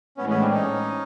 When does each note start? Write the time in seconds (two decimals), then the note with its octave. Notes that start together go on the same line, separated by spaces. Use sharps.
0.17 A2 E3 G#3 B3 C#4
0.29 B3 C#4
0.41 C4 D4
0.53 C#4 D#4